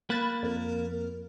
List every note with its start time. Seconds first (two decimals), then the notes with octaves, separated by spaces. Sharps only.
0.10 A#3 B5 F#6 A6
0.43 F2 A#4